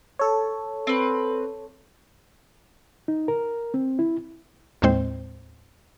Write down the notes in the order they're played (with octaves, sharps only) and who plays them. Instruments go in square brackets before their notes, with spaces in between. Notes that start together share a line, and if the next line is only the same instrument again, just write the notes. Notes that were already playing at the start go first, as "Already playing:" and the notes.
[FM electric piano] A4 C#5
[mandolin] C4 B4
[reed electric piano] D#4
A#4
C4
E4
[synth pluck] D#2 A2 G#3 C4 C5